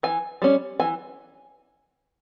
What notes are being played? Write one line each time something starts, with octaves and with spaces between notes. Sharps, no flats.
E3 G#5
G3 C#4
E3 G#5